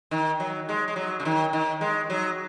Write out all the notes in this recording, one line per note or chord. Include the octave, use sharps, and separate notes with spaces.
D#3
F#3
G#3
G#3
F#3
C#3
D#3
D#3
G#3
F#3